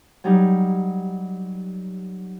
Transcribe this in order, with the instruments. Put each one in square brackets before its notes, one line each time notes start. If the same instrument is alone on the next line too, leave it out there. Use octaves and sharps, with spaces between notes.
[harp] F#3 G3 D#4